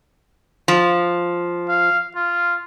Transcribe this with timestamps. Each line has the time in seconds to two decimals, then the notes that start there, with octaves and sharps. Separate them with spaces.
0.68 F3
1.68 F5
2.16 F4